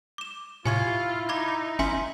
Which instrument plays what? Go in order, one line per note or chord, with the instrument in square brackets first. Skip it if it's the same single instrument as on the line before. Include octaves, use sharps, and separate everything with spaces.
[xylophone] D6 E7
[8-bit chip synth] A2 C3 [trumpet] E4 [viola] F4 [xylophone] G#5 C#6 G#6
[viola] D#4 [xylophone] B5 D6 G#6
[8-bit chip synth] G1 C#4 E5 [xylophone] G#5 C6